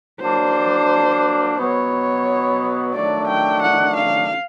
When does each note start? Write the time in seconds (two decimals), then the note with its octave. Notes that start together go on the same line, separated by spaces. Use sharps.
0.20 F#3 A#3 D4 C5
1.57 B2 F#3 B3 C#5
2.94 D#3 F#3 A3 D4 D5
3.28 G5
3.62 F#5
3.97 F5